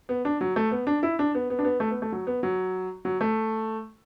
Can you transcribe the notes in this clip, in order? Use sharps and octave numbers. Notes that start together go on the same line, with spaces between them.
B3
D4
F#3
A3
B3
D4
E4
D4
B3
B3
D4
B3
A3
B3
A3
F#3
B3
F#3
F#3
A3